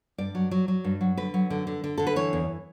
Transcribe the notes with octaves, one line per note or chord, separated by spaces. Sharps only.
G2 D5
F#3
F#3
F#3
G2
F#3
D3 B4
F#3
D3
D3
D3
D3 A4
B4
E3 C#5
E2